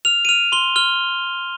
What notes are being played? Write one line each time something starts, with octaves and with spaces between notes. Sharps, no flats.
F6 F7
D#7
F6 F7
C6 G7
F6 G7